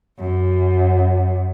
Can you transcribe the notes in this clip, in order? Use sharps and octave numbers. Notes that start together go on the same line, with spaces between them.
F#2